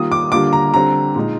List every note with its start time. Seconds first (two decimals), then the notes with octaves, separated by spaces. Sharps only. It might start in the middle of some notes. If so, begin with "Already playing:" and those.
Already playing: D#3 G3 A#3 F4 D#6
0.12 D6
0.32 D3 G3 A#3 F4 D6
0.53 A#5
0.74 D3 G3 C4 A#5
1.16 A#2 G#3 D#4